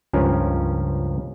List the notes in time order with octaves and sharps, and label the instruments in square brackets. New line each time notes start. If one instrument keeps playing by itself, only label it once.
[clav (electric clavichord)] C#2 G2 F3 C#4 A#4